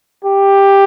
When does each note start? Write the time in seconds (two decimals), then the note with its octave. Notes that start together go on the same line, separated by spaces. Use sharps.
0.25 G4